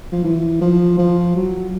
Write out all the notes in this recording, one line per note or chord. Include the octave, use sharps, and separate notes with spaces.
F3
E3
F3
F3
F#3